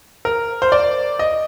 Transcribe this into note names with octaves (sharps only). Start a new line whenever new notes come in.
A#4
C5
D5
D#5